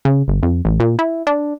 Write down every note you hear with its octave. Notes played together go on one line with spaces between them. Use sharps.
C#3
G1
F2
A1
A#2
E4
D4